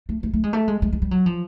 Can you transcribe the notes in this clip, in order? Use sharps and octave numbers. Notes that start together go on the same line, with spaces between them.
A3
A3
A3
G#3
A3
G#3
G#3
G#3
G3
F#3
F3